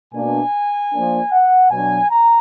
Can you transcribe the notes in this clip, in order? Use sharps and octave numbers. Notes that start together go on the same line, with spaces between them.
B2 A#3 D4 G#5
F3 A#3 D4
F#5
B2 F#3 D4 G#5
A#5